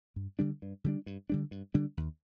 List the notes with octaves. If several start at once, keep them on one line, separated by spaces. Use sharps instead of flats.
G2
D3 G3 D4
G2
D3 G3 D4
G2
D3 G3 D4
G2
D3 G3 D4
D#2